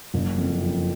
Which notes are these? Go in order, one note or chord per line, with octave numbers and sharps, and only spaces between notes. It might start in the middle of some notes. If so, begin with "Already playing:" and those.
F#1
F2
F2